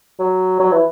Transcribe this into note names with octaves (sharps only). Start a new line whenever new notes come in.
F#3
F#3
E3